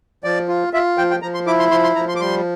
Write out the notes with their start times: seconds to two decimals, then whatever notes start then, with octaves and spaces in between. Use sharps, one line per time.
0.24 F3 D5
0.48 F4
0.73 F4 E5
0.98 F3 G5
1.11 G5
1.22 F3 A#5
1.34 C6
1.47 E4 D6
1.59 C6
1.71 F3 C6
1.83 C6
1.96 F3 A#5
2.09 C6
2.16 D6
2.20 G3 C6